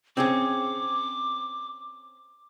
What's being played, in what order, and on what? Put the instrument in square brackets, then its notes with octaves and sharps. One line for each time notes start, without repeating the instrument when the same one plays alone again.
[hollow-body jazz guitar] C4 C#4 G#4 [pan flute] D6